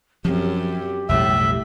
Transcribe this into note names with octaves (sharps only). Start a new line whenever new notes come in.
F#2 F3 C4 G4
B1 F2 A2 G3 E5